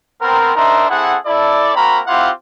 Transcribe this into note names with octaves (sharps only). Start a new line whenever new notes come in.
B3 C4 A#4
D4 D#4 A#4 C5 E5 A#5
C4 E4 G#4 A4 F#5
E4 A4 D5
A#3 C4 F#4 A#4 A#5 B5
C4 E4 F4 G4 F5 F#5